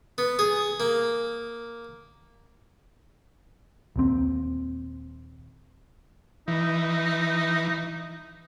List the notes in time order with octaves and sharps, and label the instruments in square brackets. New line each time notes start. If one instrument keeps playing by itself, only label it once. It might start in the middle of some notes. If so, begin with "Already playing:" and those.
[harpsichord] B3
G#4
A#3
[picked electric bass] D#1 D#2 C4
[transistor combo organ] E3 [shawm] D#4